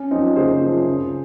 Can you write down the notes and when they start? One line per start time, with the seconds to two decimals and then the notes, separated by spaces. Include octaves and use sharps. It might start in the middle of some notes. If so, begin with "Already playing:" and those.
Already playing: C#4
0.11 F#2 F3 C4 D#4
0.36 F#1 G#4 C5
0.61 F#2 F3
0.86 C#2